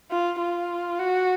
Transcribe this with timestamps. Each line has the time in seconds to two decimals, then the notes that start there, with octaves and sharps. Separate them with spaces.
0.11 F4
0.40 F4
0.99 F#4